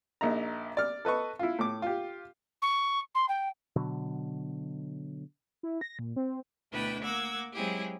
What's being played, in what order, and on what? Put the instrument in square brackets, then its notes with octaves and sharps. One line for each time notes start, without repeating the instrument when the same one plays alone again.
[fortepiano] A#1 D#4 E5 A#5
D5 F6
A4 B4 D#5 C#6
E4 F4
A2 D6
F4 G4
[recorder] C#6
C6
G5
[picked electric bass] B2 D3 F#3
[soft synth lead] E4
A#6
A#2
C4
[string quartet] D2 B2 D4 E4 B4 G5
A#3 F#5 D6 E6 G#6
F#3 G#3 C4 E4 G4 G#4